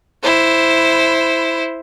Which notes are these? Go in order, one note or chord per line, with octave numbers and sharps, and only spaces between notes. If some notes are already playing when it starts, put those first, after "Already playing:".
E4 C5